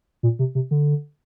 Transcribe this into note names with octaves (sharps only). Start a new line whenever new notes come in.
A#2
C3
C3
D3